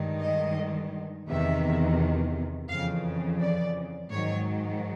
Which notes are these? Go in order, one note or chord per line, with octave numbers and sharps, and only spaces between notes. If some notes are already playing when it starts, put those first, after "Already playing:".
Already playing: G2 D#3 G#3
D#5
E2 C3 D#3 E5
F2 C#3 E3 F5
D5
G#2 D#3 F#3 C#5